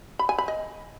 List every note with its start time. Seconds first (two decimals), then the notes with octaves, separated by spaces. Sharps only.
0.19 B5
0.29 G#5
0.38 B5
0.48 D#5